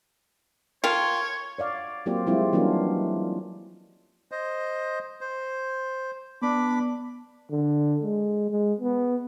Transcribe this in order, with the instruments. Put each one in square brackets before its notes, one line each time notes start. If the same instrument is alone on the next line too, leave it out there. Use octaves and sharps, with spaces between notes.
[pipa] F4 [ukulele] A#4 G5 A5 [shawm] C#5
[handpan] C#5 D5 F5
F#3 A#3 C4 F4 G4 D5
F3 G3 G#3 C4 E4 F4
E3 F#3 A#3 C#4 D4 F4
[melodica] C5 D#5
C5
[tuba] B3 [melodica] D4 B5 D6
[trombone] D3
G#3
G#3
B3